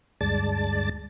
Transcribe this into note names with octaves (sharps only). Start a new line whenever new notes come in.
D2 G2 G#3 D5 A5 A6